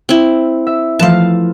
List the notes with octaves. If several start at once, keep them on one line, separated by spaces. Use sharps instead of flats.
C4 E4
E5
E3 F3 A3 F5 A5